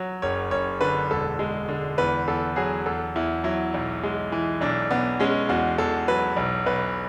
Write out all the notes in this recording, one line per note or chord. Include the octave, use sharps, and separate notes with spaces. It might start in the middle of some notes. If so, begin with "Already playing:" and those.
Already playing: F#3
F#1 C#5
F#1 C#5
D3 B4
E1 A4
G#3
D3
E2 B4
E2 A4
F#3 G#4
E2 A4
E2 E4
F#3 E4
B1
G#3
E3
B1 D4
B1 B3
G#3 C#4
E2 F#4
E2 A4
F#3 B4
B1
B1 B4